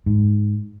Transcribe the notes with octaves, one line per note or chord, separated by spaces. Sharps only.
G#2